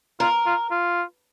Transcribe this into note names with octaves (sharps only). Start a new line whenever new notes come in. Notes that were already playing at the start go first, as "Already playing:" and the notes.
F4 A#4
F4
F4